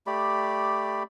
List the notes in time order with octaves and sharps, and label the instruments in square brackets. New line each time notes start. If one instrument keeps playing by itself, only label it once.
[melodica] A3 G4 D5 B5